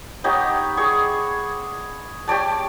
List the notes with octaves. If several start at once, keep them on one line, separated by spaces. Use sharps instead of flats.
B3 D#4 G4 C#5
G#4 D5 C#6
G4 C#5 D5 A5